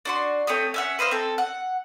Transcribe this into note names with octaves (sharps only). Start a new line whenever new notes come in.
D4 F#4 C6
A3 C4 C#5 D#6
C#4 E5 F#5
B4 C5 D#5 F5
C4 A4
F#5